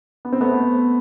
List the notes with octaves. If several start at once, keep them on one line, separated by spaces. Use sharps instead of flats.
B3
C4
A3 B3